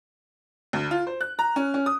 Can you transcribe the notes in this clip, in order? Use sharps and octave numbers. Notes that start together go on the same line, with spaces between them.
D2
F4
C5
F#6
A#5
C#4
C#4
D#6